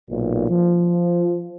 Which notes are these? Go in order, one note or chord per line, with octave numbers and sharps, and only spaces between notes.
B1 A#2
F3